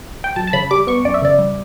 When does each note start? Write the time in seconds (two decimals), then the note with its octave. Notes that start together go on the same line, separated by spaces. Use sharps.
0.24 G5
0.36 F#2 A5
0.47 A5
0.53 C#3 B5
0.71 G3 D6
0.87 B3 C#6
1.05 F#2 D5
1.14 E5
1.22 C#3 D5
1.39 G3